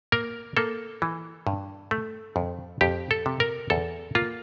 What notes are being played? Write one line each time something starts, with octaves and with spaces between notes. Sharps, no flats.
A#3 A#4
A#3 A4
E3
G2
A3
F2
F2 G4
A4
C3
A#4
E2 A4
A#3 F4